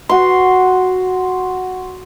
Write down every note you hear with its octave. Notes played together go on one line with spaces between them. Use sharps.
F#4 C6